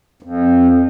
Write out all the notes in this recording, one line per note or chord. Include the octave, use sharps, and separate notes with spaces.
F2